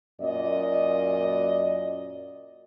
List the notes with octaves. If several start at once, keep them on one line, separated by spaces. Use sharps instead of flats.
F#2 A#2 D5 D#5